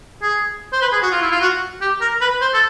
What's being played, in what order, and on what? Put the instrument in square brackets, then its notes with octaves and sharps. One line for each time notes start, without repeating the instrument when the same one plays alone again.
[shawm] G#4
C5
B4
G#4
F#4
F4
E4
F4
F#4
G4
A#4
B4
C5
A4